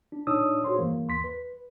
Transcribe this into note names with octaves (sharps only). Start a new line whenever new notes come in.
D4
A#2 D4 D#4 C#5 D#6 E6
F#4 G#4 C5 C#5 C6
G2 E3 A#3
D#2 C6 B6
B4